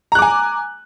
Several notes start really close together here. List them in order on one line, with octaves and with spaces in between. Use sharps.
A#5 F#6 D6 G#5